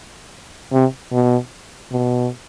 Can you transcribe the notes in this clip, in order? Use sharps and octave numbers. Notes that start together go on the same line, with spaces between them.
C3
B2
B2